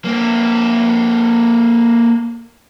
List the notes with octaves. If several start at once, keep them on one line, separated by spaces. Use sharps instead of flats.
A#3 C4